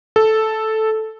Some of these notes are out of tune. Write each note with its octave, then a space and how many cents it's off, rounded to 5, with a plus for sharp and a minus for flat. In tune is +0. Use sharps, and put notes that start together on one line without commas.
A4 -5